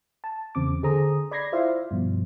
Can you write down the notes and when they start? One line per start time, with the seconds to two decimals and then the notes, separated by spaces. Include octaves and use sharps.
0.24 A5
0.55 E2 C#3 C4 D6
0.83 D3 G#4 A4 C5 A#5 D#6
1.31 D5 B5 G#6 A#6 C7
1.52 E4 F4 C5 D5 E5 F5
1.91 G2 B2 F3